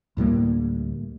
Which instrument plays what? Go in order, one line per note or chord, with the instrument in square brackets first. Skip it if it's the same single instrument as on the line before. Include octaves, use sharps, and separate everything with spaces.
[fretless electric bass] D2 A2 G3 A#3